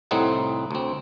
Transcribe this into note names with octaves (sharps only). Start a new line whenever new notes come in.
C2 A2 C4 D#4 F#5
D2 C4